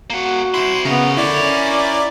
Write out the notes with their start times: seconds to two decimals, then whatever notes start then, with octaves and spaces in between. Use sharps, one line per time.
0.10 A#3 F#4 F#5
0.54 C3 E4 C6
0.85 C#3 B3 A#4 C#5
1.17 D3 E4 D5
1.42 C#4